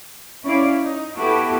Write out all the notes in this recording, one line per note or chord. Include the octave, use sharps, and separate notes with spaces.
C#4 E4 D5 F5
D#4
B3 E4 F#4 G4 A4